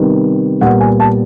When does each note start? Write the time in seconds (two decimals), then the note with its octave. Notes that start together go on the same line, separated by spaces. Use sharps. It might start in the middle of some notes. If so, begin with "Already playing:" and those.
Already playing: C3 D#3 G3 B3
0.61 A#2 G3 B3 F#5
0.81 G#5
1.00 A5